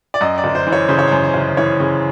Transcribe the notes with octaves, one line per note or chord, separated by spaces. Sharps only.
D5
F#2 D#5
D5
G1
C5
E3
C#5
C#3 C5
C#5
F#2 C5
C5
G1
E3 C#5
C#3